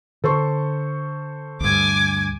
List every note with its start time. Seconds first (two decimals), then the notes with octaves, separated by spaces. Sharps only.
0.24 D3 A4 C5 C#6
1.61 D2 G2 G#5 D6